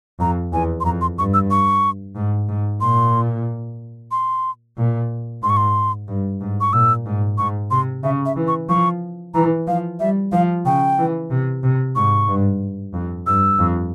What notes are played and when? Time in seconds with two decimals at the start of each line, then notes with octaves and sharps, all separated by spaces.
0.20 F2 A#5
0.53 E2 G#5
0.80 C6
0.85 F2 A#5
1.01 C6
1.18 G2 C#6
1.34 E6
1.51 C#6
2.16 G#2
2.49 G#2
2.81 A#2 C6
4.11 C6
4.77 A#2
5.43 G#2 C6
5.50 C#6
5.57 C6
6.08 G2
6.41 G#2
6.61 C#6
6.73 A#2 E6
7.06 G#2
7.38 G#2 C#6
7.71 C3 C6
8.03 C#3 E5
8.26 E5
8.36 E3
8.48 C#6
8.69 F3 C#6
9.34 E3 A#5
9.67 F3 F5
10.00 G3 E5
10.32 F3 F5
10.65 C#3 G5
10.98 E3
11.31 C3
11.63 C3
11.96 G#2 C#6
12.28 G2
12.94 F2
13.26 G2 E6
13.59 F2